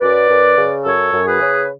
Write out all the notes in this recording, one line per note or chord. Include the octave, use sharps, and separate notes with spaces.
F#2 B4 D5
F#2
C#3
F#2 A4 C#5
F#2
G#4 B4
C#3